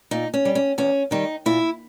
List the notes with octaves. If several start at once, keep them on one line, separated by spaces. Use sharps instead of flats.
A#2 D#4
C#4
G3
C#4
E2 C#4
D#3 G3 D#4
A#2 E4